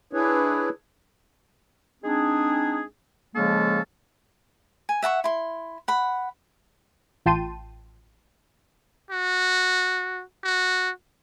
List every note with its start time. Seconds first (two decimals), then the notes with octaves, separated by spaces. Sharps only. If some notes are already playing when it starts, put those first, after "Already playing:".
0.13 D4 E4 G#4 B4 C#5
2.03 G#3 C4 D4 D#4 G#4
3.34 C#3 F3 G#3 A#3 C#4 A4
4.89 G#5
5.02 E5 F#5 A5 C#6
5.24 E4 C6
5.88 F#5 B5
7.26 A1 F4 G5 A5 C6 D#7
9.10 F#4
10.44 F#4